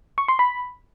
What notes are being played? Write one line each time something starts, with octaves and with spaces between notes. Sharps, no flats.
C#6
C6
B5